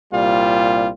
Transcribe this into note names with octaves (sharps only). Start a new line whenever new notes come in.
C2 A#2 G3 F4